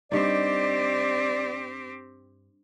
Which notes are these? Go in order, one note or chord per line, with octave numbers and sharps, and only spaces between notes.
G2 C4 D#4 G4 D5